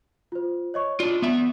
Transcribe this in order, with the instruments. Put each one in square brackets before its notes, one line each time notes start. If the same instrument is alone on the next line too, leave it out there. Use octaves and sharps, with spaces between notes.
[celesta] F4 C5
C#5 D#5 C#6
[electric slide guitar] D4 F4 [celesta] D5
[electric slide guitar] B3 E5